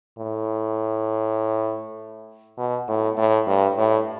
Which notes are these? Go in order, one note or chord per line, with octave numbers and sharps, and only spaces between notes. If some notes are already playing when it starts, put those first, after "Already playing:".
A2
B2
A2
A2
G2
A2